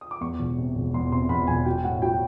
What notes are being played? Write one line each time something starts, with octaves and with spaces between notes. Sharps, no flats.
D#6
D6
E2 C#6
E1
C3
E1
E2 C6
C3 C6
E2 B5
E1 G#5
F#3 G5
A2 F#5
F#3 G5